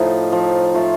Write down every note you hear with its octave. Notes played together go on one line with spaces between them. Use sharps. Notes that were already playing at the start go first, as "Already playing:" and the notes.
Already playing: A2 F3 D#4
F3
A3 F4